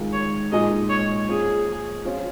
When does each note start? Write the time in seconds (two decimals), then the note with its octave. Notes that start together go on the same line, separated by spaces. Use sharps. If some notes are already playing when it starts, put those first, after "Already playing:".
Already playing: D#3 G#3 F4
0.13 C#5
0.52 A#2 G#3 D#4 G#4 D#5
0.89 C#5
1.28 A#2 F3 C#4 G#4
2.05 F3 C#4 F4